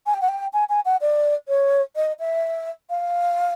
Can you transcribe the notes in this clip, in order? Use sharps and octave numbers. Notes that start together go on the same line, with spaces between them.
G#5
G5
F#5
G5
G#5
G#5
F#5
D5
C#5
D#5
E5
F5